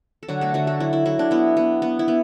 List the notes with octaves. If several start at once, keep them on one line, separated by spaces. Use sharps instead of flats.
A4
D3 F#3 F#4
A3 A4
D3 F#3 F#4
A3 A4
F#3 E4
E4
F#3 E4
D4
B3 E4
B3
B3
E4
B3